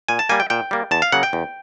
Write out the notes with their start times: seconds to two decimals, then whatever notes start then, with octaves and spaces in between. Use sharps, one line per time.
0.08 A#2 G#5
0.19 A5
0.29 G3 A#3 G#5
0.40 G5
0.50 A#2 G5
0.71 G3 A#3
0.91 E2 A5
1.02 F5
1.12 C#3 F#3 A#3 F#5
1.23 G5
1.33 E2